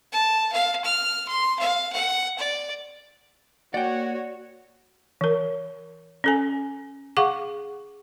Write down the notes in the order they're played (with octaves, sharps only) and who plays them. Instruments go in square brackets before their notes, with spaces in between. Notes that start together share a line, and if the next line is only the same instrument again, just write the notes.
[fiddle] A5
F5
F6
C6
F5
F#5
D5
[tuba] A#3 [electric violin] F#4 C#5 [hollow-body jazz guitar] D5 G5 [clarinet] F#5
[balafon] E3 A#4
C#4 A4 G#5
G#4 F5 F#5 C#6 D6